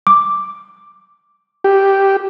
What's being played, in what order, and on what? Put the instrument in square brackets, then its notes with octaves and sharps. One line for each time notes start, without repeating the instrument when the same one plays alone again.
[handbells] D6
[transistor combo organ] G4